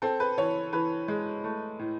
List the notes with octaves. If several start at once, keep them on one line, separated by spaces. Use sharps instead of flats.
C4 A4
B4
E3 C#5
E3 B4
G#3
A3
A2